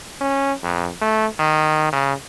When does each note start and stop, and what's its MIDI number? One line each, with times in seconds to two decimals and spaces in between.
0.21 0.53 61
0.63 0.89 41
1.01 1.26 57
1.39 1.90 51
1.92 2.13 49